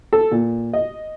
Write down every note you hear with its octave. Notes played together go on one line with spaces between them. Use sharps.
A4
A#2
D#5